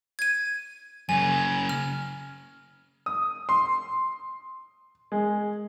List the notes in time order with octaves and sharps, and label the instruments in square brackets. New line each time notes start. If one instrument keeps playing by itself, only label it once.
[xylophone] G#6 D#7
[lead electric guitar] F#2 C#3 [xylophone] G#5
[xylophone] F6
[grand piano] D#6
C6
G#3